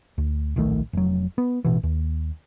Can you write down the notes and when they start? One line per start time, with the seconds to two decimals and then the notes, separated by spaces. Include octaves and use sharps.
0.18 D2
0.56 D1 A#1 D#3 A3
0.93 F1 F#3
1.38 B3
1.65 A1 B2 E3
1.83 D#2